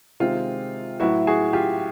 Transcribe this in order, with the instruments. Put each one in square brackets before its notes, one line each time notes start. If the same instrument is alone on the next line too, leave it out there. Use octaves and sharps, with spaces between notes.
[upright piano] C3 D#3 G#3 C4 F4
A2 F#3 B3 E4 F#4
F#4 G#4
F4 G4